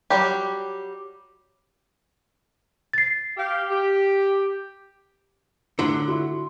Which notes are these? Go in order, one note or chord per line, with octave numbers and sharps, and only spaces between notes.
F#3 G3 G4
A6 C7
G4 F5
G4
A2 D3 F#3 C6
E4 F#4 C6